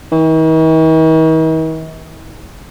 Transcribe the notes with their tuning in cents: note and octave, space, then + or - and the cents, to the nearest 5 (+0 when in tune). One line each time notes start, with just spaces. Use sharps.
D#3 +45